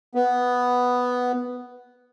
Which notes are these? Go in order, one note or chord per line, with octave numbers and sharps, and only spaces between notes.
B3